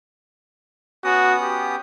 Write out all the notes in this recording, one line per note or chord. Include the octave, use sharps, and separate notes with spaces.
B3 C#4 F#4 D#6
G4